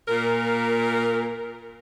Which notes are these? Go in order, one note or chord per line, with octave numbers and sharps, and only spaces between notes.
A#2 A#4